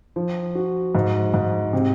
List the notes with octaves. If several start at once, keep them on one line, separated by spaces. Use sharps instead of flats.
F3
F#4
G#2
G#2
C3